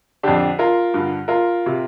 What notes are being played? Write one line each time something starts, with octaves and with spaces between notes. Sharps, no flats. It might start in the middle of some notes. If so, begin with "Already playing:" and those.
F2 D3 D4 G4
F4 A#4
G2 D3
F4 A#4
C3